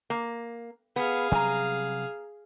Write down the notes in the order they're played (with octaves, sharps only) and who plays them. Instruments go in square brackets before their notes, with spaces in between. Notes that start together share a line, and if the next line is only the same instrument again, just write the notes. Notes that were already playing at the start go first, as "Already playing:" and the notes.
[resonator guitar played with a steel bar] A#3
[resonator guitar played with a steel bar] B3 [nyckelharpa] G#4 F5
[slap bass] C3 F#3 G3 [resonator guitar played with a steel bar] G#5 A#5